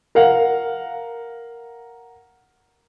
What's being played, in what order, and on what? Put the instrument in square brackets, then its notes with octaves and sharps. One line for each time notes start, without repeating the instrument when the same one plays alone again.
[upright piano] A#4 F5 F#5